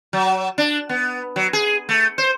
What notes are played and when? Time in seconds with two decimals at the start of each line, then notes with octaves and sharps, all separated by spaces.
0.13 F#3
0.58 D4
0.89 B3
1.36 F#3
1.53 G#4
1.89 A3
2.18 C5